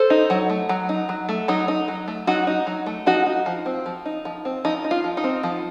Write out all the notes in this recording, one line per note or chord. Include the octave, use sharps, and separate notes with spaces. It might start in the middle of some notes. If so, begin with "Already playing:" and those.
Already playing: A4 C5
D#4
F#3
A3
F#3
D#4
F#3
A3
F#3 D#4
D#4
F#3
A3
F#3 D#4 F#4
D#4
F#3
A3
F3 D#4 F#4
D#4
F3
C4
F3
D#4
F3
C4
F3 D#4
D#4
F4
F3
D#4
C4
F3